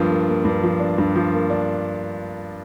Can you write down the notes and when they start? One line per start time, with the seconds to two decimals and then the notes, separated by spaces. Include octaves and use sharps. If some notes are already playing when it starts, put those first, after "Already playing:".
Already playing: G2 F3 A#3 D4
0.10 A#3
0.29 A#3
0.45 G2
0.63 F3
0.80 D4
0.98 G2
1.16 F3
1.33 A#3
1.50 D4